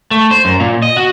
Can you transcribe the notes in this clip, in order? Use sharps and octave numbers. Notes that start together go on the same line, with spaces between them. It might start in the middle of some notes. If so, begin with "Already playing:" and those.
A3
C5
F#2
A#2
D#5
F#4